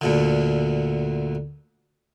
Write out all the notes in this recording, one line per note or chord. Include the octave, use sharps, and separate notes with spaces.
D2 A#2 D3